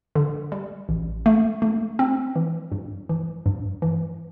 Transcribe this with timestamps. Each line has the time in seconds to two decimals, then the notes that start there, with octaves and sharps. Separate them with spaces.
0.15 D3
0.52 G3
0.89 A1
1.26 A3
1.62 A3
1.99 C4
2.36 E3
2.72 G2
3.09 E3
3.46 G2
3.82 E3